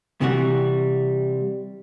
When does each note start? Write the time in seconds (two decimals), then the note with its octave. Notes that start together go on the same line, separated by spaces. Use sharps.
0.21 C3 E3 G3 F#4